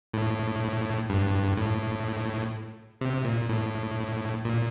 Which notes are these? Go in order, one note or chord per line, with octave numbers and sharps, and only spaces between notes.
A2
G2
A2
C3
A#2
A2
A#2